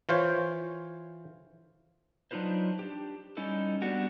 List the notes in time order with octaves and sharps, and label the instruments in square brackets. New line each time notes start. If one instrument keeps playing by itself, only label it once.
[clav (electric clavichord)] E3 F4 C5 C#5
[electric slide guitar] F#3 D4 D#4 F4 B4 C5
D4 G4
G3 C#4 D#4 E4 A4
G3 B3 D4 F#4 G4